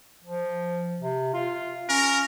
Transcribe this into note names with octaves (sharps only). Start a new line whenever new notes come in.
F3
C3
F4
C#4 A#4